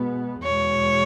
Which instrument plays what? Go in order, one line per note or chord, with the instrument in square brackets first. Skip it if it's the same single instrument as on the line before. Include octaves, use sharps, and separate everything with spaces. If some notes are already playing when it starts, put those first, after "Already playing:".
Already playing: [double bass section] B2 G#3 B3
[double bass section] E2 B2 G#3 [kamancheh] C#5